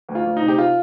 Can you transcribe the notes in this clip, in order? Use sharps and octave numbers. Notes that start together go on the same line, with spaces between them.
D2
F4
D2
D#4
C3
G4
F4